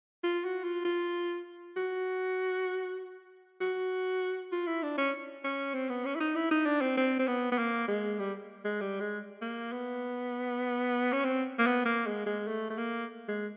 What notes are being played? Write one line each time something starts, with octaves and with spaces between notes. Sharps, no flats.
F4
F#4
F4
F4
F#4
F#4
F4
E4
D4
C#4
C#4
C4
B3
C#4
E4
D#4
E4
D#4
D4
C4
C4
C4
B3
B3
A#3
G#3
G3
G#3
G3
G#3
A#3
B3
C#4
C4
A#3
B3
A#3
G#3
G#3
A3
A3
A#3
G#3